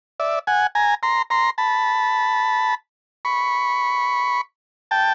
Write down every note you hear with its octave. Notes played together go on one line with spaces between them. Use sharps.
D5 E5
F#5 G#5
G#5 A#5
A#5 C6
A#5 C6
A5 B5
B5 C#6
G5 A5